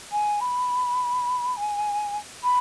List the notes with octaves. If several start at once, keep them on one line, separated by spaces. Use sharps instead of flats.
G#5
B5
G#5
B5